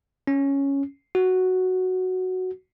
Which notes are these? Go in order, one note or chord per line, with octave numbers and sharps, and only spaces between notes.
C#4
F#4